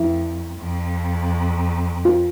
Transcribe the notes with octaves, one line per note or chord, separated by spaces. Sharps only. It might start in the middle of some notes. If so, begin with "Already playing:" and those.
Already playing: F2 E4
F2
F4